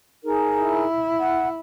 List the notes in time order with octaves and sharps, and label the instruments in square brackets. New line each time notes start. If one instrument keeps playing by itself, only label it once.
[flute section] D#4 G#4 A#4
[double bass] E4
[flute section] F#5